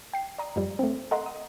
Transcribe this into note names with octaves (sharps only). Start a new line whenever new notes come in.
G5 C7
D5 A#5 D#6
F#2 F3 G3
A3 C4
A4 A#4 D#5 F#5 A#5 C6
D#6